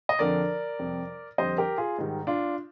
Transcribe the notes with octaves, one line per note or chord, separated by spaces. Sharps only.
D#5
F2 D3 F3 A#4 D5
F2 C3 G3
F2 D3 G3 C5 D#5
G4 A#4
F4 G#4
G#2 D#3 G3
D4 F4